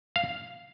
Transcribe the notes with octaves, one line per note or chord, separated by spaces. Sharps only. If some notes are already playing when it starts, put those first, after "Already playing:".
F5